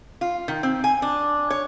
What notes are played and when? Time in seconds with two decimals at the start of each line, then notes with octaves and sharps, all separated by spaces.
0.21 F4
0.48 D#3
0.63 C4
0.84 G#5
1.02 D4
1.50 C#5